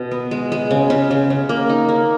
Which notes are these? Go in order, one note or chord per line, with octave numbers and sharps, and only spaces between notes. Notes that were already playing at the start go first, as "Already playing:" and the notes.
Already playing: B2
B3
G#3
G#3
C#3
C#3
C#3
C#3
A#3
D#4
A#3